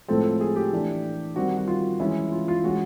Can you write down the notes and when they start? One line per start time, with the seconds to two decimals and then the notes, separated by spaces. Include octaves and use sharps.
0.08 A2 F3 G#3 C4 A4
0.41 G#4
0.56 G4
0.73 E3 A3 D4
1.36 D#3 G3 C4 F#4
1.57 F#4
1.68 F4
2.00 E3 G#3 C#4 E4
2.32 F4
2.48 F4
2.64 E3 G#3 C#4 F#4